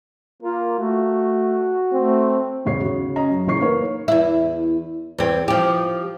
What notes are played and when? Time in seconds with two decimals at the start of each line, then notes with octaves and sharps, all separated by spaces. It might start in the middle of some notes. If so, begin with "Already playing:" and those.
0.43 A#3 F4
0.79 A3 F#4
1.94 A3 C4
2.65 E2 G#2 C#3 C#5 C7
2.81 C#3 F#4
3.16 C#4 D#5 A#5
3.31 F#2
3.47 A#1 C#3 E3 C#5 C#6 C7
3.61 A#3 D#4 A#4 B4 C#5
4.08 E2 E4
5.18 E2 C4
5.48 F3 G4